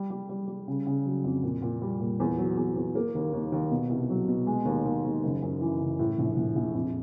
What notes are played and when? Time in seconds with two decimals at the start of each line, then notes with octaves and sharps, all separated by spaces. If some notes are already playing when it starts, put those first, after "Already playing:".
Already playing: G3
0.10 G3
0.29 G3
0.48 G3
0.68 C#3
0.86 C#3
1.06 F#3
1.24 F2
1.43 A#2
1.62 A#2
1.82 G3
2.00 A#2
2.20 E2
2.38 F#3
2.57 E2
2.76 E2
2.95 A#3
3.15 D#2
3.33 D#2
3.52 D#2
3.71 B2
3.89 C2
4.10 F#3
4.28 B2
4.47 G#3
4.65 D#2
4.85 D#2
5.05 D#2
5.23 F#1
5.42 F#2
5.61 E3
5.80 C#3
5.99 A2
6.19 A#1
6.37 A#1
6.56 A#1
6.74 F2